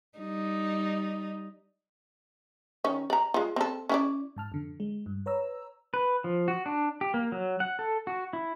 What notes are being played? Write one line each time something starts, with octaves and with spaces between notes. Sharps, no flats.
G3 D#4
D#3 C#4
D5 A#5
G#3 F4
C4 A4
C#4 E4 D5
G#2 A5 F6
F2 D3
G#3
G2
B4 C#5 A#5 E6
B4
F3
F#4
D4
G4
A#3
F#3
F#5
A4
F#4
E4